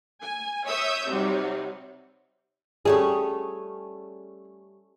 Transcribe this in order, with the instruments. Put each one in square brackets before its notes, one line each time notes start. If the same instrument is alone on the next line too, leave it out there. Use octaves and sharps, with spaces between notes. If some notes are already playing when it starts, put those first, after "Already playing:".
[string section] G#5
C#5 E5 D#6 E6 G6
C3 F#3 G3 D#4
[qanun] G3 A3 C#4 [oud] G#4